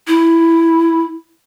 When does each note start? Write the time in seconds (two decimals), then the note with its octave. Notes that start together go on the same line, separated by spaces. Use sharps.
0.08 E4